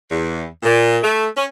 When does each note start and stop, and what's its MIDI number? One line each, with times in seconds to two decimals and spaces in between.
0.10 0.44 40
0.63 0.97 46
1.03 1.26 57
1.37 1.45 61